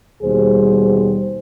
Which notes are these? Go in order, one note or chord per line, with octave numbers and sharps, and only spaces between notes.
D#2 B2 G3 G#4 C5